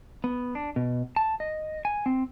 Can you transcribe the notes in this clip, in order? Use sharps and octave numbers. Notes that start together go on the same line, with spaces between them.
B3
D4
B2
A5
D#5
G#5
C4